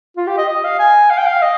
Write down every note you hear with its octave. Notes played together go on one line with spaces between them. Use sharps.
F4
G4
D#5
D#5
F5
G#5
F5
G5
F5
D#5